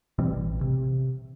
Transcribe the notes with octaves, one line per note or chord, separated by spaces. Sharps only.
B2 E3 G3 C4
A1
C3